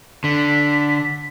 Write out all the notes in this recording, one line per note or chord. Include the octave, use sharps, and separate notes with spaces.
D3 B6